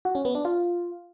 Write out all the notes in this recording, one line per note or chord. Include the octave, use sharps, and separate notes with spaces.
F#4
C#4
B3
D4
F4